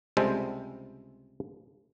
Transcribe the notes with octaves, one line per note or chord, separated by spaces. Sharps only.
C#2 C3 G3 G#3 A4 C5